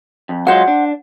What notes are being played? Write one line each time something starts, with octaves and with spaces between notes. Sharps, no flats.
F2
F#3 G#3 F4 C5 F#5
D4